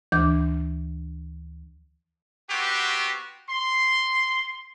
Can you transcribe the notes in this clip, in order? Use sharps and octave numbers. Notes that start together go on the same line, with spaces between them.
D2 E3 D4 D6 G6
B3 C4 F#4 G4
C6